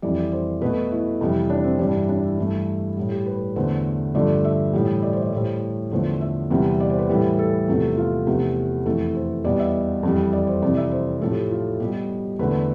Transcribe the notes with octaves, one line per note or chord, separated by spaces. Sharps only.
F2 E3 G3 D5
D5
C5
B2 A3 B4
E4
F2 C3 E3 G3
D4
C4
G2 E3 G3 D4
D4
E4
G2 E3 A3
A2 G3
G4
B4
E2 D3 A3 C5
G2 D3 F3 A3 D5
E5
A2 E3 G3
D5
C5
D5
A2 G3 C5
E2 D3 F3 A3 C5
E5
E2 C3 E3 G3
D5
C5
B4
A2 E3 G3
A4
E2 C3 F3 A3
F4
E2 C3 F3 A3 G4
F2 E3 A3 A4
C5
E2 B2 G3 D5
E5
F2 E3 G3
D5
C5
F2 C3 E3 D5
E5
C5
A2 F3 A3 A4
G4
F4
B2 G3 G4
E2 D3 A3 B4